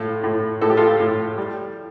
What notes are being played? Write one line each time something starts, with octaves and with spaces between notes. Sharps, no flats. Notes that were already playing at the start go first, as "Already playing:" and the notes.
Already playing: A2 F4 A4
A2
A2 A4
G4
F4 A4
A2
G3